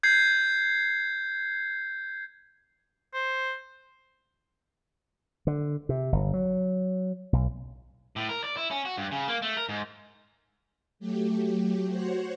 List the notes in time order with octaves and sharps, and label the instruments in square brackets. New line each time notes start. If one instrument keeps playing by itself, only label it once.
[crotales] G6 G#6 C7
[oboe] C5
[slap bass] D3
C3
G1
F#3
B1
[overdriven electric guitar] A2
A#4
D5
E4
C#4
F#4
G2
C#3
A#3
A3
A#4
G#2
[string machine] F#3 A3 G4
F#4 C5 C#5 F#5